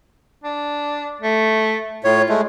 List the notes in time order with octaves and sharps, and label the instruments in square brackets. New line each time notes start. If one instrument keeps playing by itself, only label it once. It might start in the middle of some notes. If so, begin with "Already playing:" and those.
[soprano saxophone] D4
A3
[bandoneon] A2 C#5 [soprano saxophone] F4
[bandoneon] G#3 A3